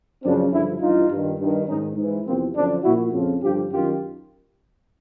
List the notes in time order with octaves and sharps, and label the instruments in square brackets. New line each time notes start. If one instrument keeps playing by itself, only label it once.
[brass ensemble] F#2 C#3 F3 C4 D4
G2 D3 F3 D4 E4
G2 E3 D#4 F4
G2 D#3
G2 D#3
G#2 D#3 C#4 D#4
G#2 E3
E2 C3 F3 A#3 C4
F#2 D3 F3 C4 D4
A#2 F3 E4 F#4
F2 C#3 F3
G2 D3 F3 F4 G4
F#2 D#3 F4 G4